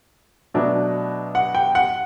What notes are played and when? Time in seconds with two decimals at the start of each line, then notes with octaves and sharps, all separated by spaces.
0.54 B2 F#3 A3 D4
1.35 F#5
1.55 G5
1.75 F#5